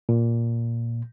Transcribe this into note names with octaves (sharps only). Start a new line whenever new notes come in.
A#2